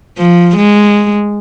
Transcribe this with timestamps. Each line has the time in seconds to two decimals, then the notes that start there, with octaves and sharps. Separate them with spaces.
0.19 F3
0.57 G#3